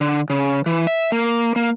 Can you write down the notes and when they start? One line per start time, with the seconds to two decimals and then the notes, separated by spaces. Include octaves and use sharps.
0.01 D3
0.30 C#3
0.66 E3
0.87 E5
1.12 A#3
1.56 A#3